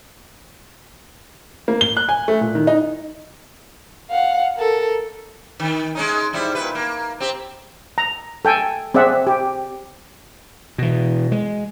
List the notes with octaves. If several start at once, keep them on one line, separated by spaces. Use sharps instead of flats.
A#3
G7
F#6
G#5
A3
A#2
D#3
D#4
F5 F#5
A4 A#4
D#3
G#3 C#4 D#4
G#2 G3 E4
A#2 B4
A#3
C4 G4
A#5
A4 G5 G#5
C4 G#4 D5 E5 F#5
G4
B2 E3
G#3